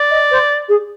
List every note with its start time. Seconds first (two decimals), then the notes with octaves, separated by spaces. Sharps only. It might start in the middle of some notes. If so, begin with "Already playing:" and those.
Already playing: D5
0.10 D#5
0.30 C5
0.68 G#4